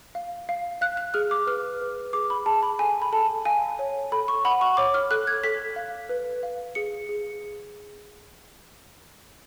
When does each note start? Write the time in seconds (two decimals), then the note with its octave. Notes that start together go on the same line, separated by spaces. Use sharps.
0.15 F5
0.49 F5
0.81 F5 F#6
0.97 F#6
1.14 G#4 F6
1.31 D6
1.47 B4 F6
1.81 B4
2.13 G#4 D6
2.30 B5
2.46 G#4 A5
2.63 B5
2.79 A4 G#5
3.02 B5
3.12 A4 A5
3.45 F5 G#5
3.79 C#5
4.12 A4 B5
4.28 C#6
4.45 F#5 B5
4.61 C#6
4.77 C#5 D6
4.94 F6
5.11 A4 F#6
5.27 G#6
5.44 A4 B6
5.76 F5
6.09 B4
6.43 F5
6.75 G#4 C#7
7.09 G#4